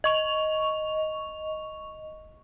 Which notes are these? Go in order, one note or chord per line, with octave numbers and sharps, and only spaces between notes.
D#5 C#6 F7